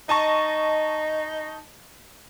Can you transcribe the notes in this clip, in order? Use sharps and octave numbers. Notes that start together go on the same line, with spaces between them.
D#4 D#5 A5 C#6